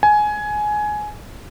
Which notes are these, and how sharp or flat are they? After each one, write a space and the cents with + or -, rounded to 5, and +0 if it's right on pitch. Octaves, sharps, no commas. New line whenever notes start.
G#5 +15